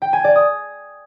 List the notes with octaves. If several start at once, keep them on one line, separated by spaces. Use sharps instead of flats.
G5
G#5
D5
D#6